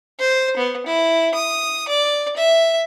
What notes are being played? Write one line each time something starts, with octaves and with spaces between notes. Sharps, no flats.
C5
B3
E4
D#6
D5
E5